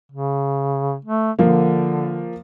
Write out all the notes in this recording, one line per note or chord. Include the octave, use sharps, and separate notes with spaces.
C#3
A3
D3 F3 A#3